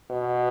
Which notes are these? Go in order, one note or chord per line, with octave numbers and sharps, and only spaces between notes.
B2